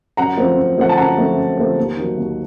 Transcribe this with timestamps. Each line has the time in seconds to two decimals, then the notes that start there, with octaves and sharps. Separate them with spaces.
0.17 F#2 F#5 A#5
0.37 F3 A3 C4
0.57 F#2
0.78 F3 A3 C4 F#5
0.89 A5
0.97 F#2 F#5 A#5
1.17 F3 A3 C4
1.37 F#2
1.58 F3 A3 C4
1.78 D#2
1.97 D#3 F#3
2.17 D#2